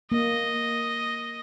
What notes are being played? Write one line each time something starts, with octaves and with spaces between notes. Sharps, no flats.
A#3 D#5